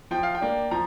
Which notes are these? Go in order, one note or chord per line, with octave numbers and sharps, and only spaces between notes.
F3 G5
F5
G5
A#3 D4
F3 A#5